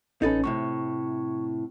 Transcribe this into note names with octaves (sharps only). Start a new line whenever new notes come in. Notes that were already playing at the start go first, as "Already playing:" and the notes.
A1 C#4 D#4 A4 B4
D2 A2 C3 C#6